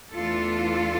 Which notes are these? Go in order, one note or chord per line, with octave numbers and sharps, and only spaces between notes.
E2 E3 A3 D4 F4 A4